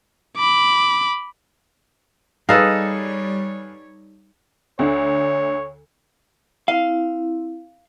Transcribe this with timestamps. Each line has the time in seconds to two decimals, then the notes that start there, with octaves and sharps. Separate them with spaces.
0.37 B5 D6
2.49 G3 D#4 G#4 A4 B4 C#5 F5
4.79 D2 D3 C#5
6.68 C4 E4 F5